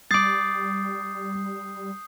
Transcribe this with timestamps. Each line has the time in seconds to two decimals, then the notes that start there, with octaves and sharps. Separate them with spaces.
0.11 G3 D6 D#6 G6 A6 C7